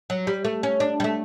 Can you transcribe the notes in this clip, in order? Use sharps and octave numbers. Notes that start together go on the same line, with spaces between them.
F#3
G3
A3
C#4
D4
G3
A3